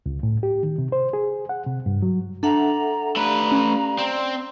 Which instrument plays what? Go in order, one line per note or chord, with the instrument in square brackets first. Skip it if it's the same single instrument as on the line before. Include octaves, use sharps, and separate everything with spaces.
[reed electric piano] C#2
A2
G4
D#3
C3
C5
G#4
F#5
C3
G2
F#3
[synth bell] D4 [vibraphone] A4 E5 F#5 [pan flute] A#5
[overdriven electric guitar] A3 B4 [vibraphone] G4 D5 F5 [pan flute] A#5
[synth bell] C#4
[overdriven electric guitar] C4 [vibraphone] D5